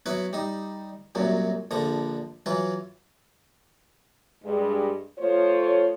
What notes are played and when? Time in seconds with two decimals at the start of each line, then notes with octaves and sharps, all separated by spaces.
0.06 F#3 B3 E4 B4
0.33 G3 D#4
1.15 C2 F#2 A#2 F#3
1.71 A#1 D3 F3 A#5
2.46 E3 F#3 F4
4.44 G2 G#3
5.19 F3 A3 F4 C5 C#5